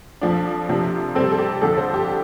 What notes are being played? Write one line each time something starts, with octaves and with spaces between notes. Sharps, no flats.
F2 F3 D4
C3 F3 D4
C3 G3 C4 A4
A4
G4
F2 D3 F3 D4 A4
C5
G4